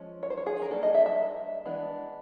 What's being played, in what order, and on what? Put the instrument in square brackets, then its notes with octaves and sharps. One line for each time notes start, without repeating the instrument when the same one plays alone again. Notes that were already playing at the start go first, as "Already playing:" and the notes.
Already playing: [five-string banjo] F3 G#3 C#4
C#5
C5
C#5
G#4
A#4
G3 A#3 D4 A4
D#5
E5
E5
E3 G#3 B3 D4